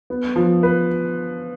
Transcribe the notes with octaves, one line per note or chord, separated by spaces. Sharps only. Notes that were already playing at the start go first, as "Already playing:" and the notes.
B3
F3
B4